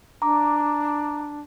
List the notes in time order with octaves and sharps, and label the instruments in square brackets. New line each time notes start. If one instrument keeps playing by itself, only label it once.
[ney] D4 [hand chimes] A#5 D6